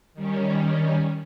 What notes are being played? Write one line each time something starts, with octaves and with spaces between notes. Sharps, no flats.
D#3 G3 C#4